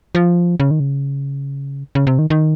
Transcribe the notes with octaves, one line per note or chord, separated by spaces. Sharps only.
F3
C#3
D#3
C#3
C#3
C3
D#3
D#3